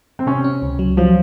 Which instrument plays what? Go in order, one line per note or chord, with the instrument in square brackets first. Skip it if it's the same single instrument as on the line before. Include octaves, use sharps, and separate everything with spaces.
[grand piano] C4
[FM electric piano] C3 [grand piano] C#4
[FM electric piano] C#4
C#2
F#3
[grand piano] F3 [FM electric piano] F#3